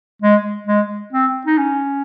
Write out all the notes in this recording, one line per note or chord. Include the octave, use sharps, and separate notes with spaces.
G#3
G#3
C4
D#4
C#4